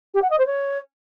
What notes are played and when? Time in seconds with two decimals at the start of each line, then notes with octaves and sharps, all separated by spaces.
0.14 G4
0.22 F#5
0.30 D#5
0.38 C5
0.47 C#5